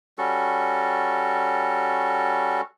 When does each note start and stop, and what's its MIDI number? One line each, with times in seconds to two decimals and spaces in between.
0.18 2.61 55
0.18 2.61 61
0.18 2.61 66
0.18 2.61 69